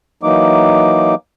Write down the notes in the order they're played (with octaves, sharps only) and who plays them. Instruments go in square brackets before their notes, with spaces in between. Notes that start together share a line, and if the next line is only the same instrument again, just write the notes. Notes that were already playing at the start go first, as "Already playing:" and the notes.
[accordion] E3 F#3 A#3 D#4 D6